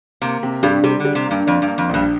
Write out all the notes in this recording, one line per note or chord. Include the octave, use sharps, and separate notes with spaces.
C3 A#3
C3
G2 G3
C3 G3
D3
G3
C3
G2 A#3
F2 D4
G2
A#3
F2
A#1 G2